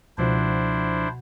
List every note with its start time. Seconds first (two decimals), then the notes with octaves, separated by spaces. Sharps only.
0.18 C#2 B2 F3 D4 E4 C5 F#5 F#6